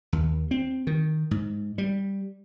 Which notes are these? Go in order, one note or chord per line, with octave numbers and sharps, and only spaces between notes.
D#2
C4
D#3
G#2
G3